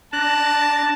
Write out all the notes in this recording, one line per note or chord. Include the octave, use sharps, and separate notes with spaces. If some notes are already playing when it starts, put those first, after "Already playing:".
D4 A5 A#5 F#6